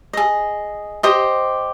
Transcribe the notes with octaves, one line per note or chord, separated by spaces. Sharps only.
G#4 D#5
G4 C5 D#5 D#6